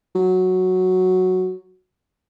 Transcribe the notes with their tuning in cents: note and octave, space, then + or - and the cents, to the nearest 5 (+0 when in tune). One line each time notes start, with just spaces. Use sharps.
F#3 +0